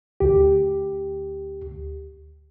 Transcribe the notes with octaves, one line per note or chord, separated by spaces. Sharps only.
D2 G4